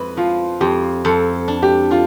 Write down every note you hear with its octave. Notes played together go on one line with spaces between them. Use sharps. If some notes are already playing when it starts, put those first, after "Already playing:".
Already playing: F2 B4
F3 F4
F2 G4
F2 A4
D4
G4
D4 F4